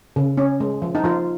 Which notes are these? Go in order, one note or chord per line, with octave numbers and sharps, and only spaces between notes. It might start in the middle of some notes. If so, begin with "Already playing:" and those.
C#3
C#4
G#3
F3
D#4
F3 F4